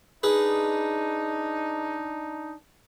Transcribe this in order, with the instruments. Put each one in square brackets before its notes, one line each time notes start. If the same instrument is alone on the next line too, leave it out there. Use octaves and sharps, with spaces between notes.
[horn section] D4 D#4 [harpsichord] G#4 B4